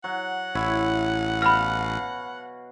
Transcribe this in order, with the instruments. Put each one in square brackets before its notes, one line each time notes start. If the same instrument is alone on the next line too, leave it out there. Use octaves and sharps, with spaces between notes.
[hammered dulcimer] F#3 [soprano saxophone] F#5
[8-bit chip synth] A1 [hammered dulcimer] E4 C#5 E5
[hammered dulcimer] B2 F5 [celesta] B5 F6